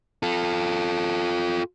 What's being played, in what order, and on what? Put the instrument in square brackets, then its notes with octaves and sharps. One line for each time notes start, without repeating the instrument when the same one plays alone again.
[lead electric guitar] F4 A4